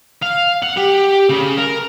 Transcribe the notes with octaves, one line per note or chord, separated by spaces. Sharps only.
F5
F#5
G4
C#3
A#4